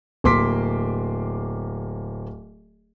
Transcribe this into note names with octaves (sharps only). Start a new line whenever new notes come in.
D1 A#3 C6 D6 B6